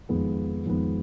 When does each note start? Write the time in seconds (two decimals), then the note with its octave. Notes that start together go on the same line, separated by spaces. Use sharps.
0.09 F2 D#3 G#3 B3
0.66 F2 D#3 G#3 B3